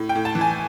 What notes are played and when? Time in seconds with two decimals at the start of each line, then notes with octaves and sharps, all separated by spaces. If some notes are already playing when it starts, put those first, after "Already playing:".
Already playing: A2
0.09 G5
0.15 A2
0.25 A5
0.35 E3
0.41 G#5